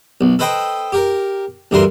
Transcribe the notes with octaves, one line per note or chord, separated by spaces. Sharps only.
B1
A4 B4 C5 D#5 G5
G4 A#4
D2 G2 E3 A#4 C6